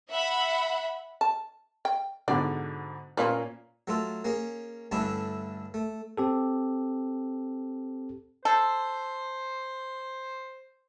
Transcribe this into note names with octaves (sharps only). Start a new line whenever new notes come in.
E5 F#5 B5
A5
G5
G#2 B2 D3 D5
A#2 F3 A#3 C#4 F4 B4
F#3 A3 F4 A4
A#3 C#4 G#4
G2 D3 A3 C#4 D4 E4
A3
C4 G4 A4
A4 C5